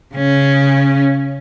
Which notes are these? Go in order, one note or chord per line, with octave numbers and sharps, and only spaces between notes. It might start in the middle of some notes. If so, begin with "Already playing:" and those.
C#3 C#4